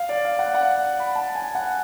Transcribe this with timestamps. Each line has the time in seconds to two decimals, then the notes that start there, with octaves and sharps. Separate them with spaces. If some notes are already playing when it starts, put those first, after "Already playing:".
Already playing: F5
0.09 D5
0.25 F5
0.39 F#5
0.54 F#5
0.99 B5
1.15 A5
1.35 G#5
1.55 F#5